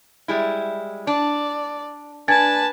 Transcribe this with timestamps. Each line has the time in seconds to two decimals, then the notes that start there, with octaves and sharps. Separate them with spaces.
0.28 G3 G#3 E4
1.07 D4 D5
2.28 D4 B4 G#5 A5 G#6 A6